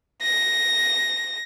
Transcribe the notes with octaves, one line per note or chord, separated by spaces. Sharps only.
A#6